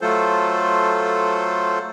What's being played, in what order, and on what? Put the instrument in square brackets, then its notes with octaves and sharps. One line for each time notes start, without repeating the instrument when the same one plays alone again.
[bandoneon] F#3 A3 F4 A4 C5